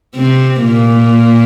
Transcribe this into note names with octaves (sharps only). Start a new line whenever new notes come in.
C3 C4
A#2 A#3